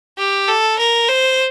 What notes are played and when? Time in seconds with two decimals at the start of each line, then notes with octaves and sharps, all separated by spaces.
0.18 G4
0.48 A4
0.79 A#4
1.09 C5